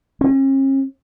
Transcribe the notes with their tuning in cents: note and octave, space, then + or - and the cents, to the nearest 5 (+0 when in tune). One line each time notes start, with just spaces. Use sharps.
C#4 -45